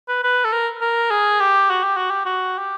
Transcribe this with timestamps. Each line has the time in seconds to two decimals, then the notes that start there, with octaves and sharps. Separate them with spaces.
0.08 B4
0.23 B4
0.45 A4
0.52 A#4
0.81 A#4
1.11 G#4
1.40 G4
1.70 F#4
1.84 G4
1.97 F#4
2.11 G4
2.25 F#4
2.58 G4